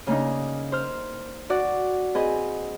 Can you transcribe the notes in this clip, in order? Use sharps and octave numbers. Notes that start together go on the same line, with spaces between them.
C#3 A#3 D4 D#4
C5 F6
F#4 D5 F#5
C4 G#4 B4 D#5